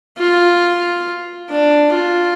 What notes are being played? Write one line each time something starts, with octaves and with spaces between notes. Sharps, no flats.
F4
D4
F4